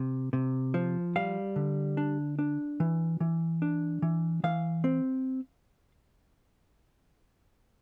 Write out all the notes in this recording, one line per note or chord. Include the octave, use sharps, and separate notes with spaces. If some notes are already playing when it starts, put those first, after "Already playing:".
Already playing: C3
C3
F3
G3 F5
D3
D4
D4
E3
E3
D4
E3
E3 F5
C4